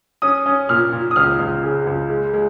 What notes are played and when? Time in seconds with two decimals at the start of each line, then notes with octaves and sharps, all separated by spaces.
0.22 C#4 D#6
0.46 C#4
0.69 A#2 F6
0.92 A#2
1.11 D#6
1.16 C#2 F6
1.39 C#2
1.64 C#3
1.87 C#2
2.10 G#3
2.34 G#3